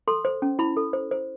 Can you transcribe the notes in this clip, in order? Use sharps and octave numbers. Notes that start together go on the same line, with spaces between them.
A4 C6
C5
C#4
E4 B5
A4
C5
C5